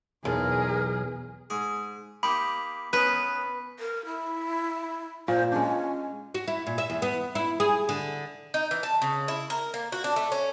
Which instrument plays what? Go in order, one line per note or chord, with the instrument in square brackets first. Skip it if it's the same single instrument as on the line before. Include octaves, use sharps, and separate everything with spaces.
[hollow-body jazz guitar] B1 [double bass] E2 [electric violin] G#4 [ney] A#4
[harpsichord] G#2 G#4
[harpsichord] A#3 D#4 G4 [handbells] B5
[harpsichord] B3 C#4 D#4 [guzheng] B4
[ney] A#4
E4
[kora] A#2 [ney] C5
[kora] G#3 D4 [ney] C#4
[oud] F#4
E4
A#2
E5
E2
B3
E4
G#4
D3
[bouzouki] D#4
E3
A5
C#3
E4
A#4
A#3
F#4
D4
A3
C#4